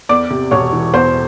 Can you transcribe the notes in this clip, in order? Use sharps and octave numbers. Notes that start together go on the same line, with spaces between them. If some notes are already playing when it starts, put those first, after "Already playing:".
E2 D5 D6
C3
E1 C#5 C#6
E3
E2 C5 C6